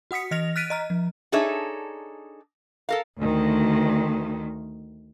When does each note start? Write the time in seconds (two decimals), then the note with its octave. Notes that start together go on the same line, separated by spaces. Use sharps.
0.11 F#4 F#5 D#6 B6 C#7
0.31 E3 D#5 F6 A#6 F7
0.56 F6 F#6 A6 B6 D7 D#7
0.70 D#5 A#5 F6
0.90 F3
1.32 D4 D#4 G#4 A4 C#5 E5
2.89 A4 A#4 F5
3.20 D2 D#3